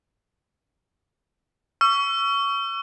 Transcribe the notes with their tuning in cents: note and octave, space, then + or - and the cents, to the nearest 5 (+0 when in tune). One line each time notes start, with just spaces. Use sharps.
C#6 +25 E6 +40